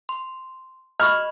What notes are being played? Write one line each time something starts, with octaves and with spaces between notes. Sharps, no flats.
C6
D#5 B5 C#6 F6